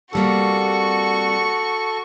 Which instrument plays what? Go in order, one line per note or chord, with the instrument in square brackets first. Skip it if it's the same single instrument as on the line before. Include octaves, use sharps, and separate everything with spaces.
[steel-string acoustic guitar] C3 G3 A#3 [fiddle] F#4 C#6 [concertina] A4